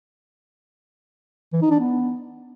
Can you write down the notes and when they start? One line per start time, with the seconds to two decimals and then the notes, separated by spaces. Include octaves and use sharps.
1.53 E3
1.62 D#4
1.71 D4
1.80 B3